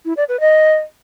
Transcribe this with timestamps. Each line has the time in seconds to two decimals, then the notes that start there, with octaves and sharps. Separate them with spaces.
0.05 E4
0.17 D5
0.29 B4
0.40 D#5